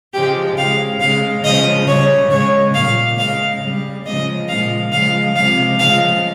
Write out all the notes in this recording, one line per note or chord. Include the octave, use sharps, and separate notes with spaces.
C#3 F3 G#3 G4
C#3 G#3 F5
C#3 G#3 F5
C#3 F3 G#3 D#5
C#3 G3 C#5
C#3 G#3 C#5
A#2 G3 F5
C#3 G#3 F5
C#3 G3
C#3 F3 G#3 D#5
A#2 F3 G#3 F5
C#3 F3 G#3 F5
C3 F3 G#3 F5
C#3 F3 G#3 F5